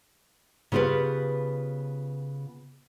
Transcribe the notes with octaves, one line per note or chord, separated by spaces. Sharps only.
C#3 B3 F4 G4 B4